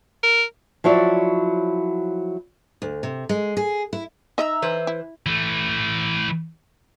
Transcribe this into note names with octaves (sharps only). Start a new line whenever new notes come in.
A#4
F3 F#3 E4 C#5 D5
D2
C3
G#3
G#4
E4
D#4 D#5 E5 A#5 E6
E3 B4 C5
E4
E3 A3